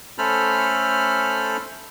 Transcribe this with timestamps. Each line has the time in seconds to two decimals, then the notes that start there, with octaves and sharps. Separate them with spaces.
0.18 A3 C#4 A4 C5 B5 F6